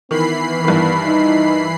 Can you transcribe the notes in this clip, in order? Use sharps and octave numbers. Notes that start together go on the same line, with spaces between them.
D#3 E3 B3 B5 C7
G2 D#3 B3
D#4